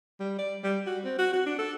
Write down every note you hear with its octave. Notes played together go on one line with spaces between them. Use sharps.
G3
D5
G3
F#4
C4
F#4
F#4
D4
A4